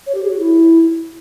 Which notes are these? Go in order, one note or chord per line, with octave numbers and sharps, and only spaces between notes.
C#5
G4
G#4
F#4
E4